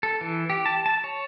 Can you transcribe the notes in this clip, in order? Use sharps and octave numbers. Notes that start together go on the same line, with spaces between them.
A4
E3
G4
A5
A5
C#5